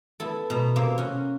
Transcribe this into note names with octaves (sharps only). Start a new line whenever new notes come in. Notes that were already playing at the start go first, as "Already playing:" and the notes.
B3 E4 A4
B2 A#5
C3 A#3
C#4 F#4